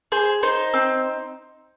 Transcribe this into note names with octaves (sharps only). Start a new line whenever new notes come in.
G#4 C5
D#4 C5
C4